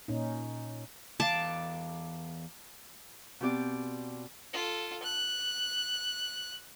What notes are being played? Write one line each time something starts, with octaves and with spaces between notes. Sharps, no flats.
A#2 C#4 D#4
E2 F5 A5 D6
B2 C4 G4 D5
F4 A4
F#6